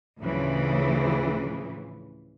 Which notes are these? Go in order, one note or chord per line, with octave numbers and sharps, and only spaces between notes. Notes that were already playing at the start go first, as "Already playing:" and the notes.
D2 A2 C#3 E3 F3